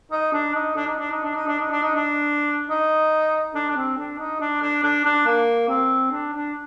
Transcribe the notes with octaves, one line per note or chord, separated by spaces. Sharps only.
D#4
D4
D#4
D4
D#4
D4
D#4
D4
D#4
D4
D#4
D4
D#4
D4
D#4
D4
D4
C4
D4
D#4
D4
D4
D4
D4
A#3
C4
D4
D4